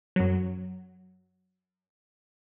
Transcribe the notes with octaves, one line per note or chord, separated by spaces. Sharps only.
F#2 F#3